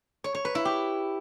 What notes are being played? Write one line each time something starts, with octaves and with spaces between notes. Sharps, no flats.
C#5
C#5
B4
E4
G4